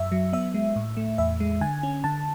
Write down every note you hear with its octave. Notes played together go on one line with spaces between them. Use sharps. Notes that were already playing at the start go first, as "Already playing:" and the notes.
Already playing: F#2 E5
F#3
B3 E5
G#3
A2
A3
E2 E5
G#3
D3 G#5
C#4
D3 A5